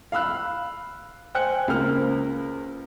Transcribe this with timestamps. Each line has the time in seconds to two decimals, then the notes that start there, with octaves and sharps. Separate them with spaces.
0.12 F5 B5 E6 F#6
1.35 C5 G5 G#5 F#6 C#7
1.68 C#2 A#3 C5 F6